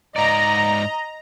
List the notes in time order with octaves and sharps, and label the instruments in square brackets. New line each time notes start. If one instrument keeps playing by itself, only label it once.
[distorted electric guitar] G#2 D5 [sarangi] D#5 [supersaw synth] A#5